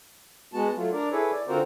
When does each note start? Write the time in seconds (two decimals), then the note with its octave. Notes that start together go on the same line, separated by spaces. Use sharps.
0.54 G#3 B3 F#4 A5
0.76 F#3 A3 F4
0.93 D4 A#4 D5
1.12 E4 G#4 A4 B4 C#5
1.31 D5
1.48 D3 C4 F4 F#4 A#4 C5